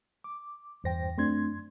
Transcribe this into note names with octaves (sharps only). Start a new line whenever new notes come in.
D6
E2 G2 C5 G5 A#6
F#2 A3 C4 D4 C6 G#6